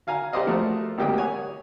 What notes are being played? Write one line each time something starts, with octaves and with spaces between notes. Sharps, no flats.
F#4 F5 G#5 A#5
G4 A#4 C5 D5 D#5 F5
F3 A3 F#4 A#4 C5
G#1 D2 A#3 G4 G5 D#6
C#5 F#5 G#5